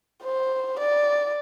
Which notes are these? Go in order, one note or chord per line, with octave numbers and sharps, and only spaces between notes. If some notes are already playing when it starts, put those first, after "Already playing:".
C5
D5